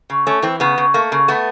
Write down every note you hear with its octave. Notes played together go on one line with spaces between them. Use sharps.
C#3
A3 C#4
E3 C4
C#3 B3
C#3
A3 A#3
C#3
A3 B3